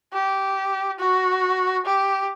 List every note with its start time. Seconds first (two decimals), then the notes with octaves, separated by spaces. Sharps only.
0.13 G4
0.99 F#4
1.85 G4